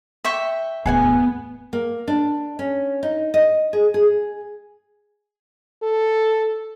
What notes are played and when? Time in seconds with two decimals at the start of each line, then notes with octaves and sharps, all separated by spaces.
0.24 E5 G5 C#6
0.86 D1 E2 B3 G#4 F#5 G#5
1.73 A#3
2.08 D4
2.59 C#4
3.03 D#4
3.34 D#5
3.73 G#4
3.94 G#4
5.83 A4